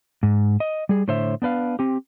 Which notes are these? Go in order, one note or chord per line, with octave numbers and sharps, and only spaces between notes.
G#2
D#5
G3 G#4
A2 D3 C5 C#5 E5
B3 D4 B4 F5
C4 G4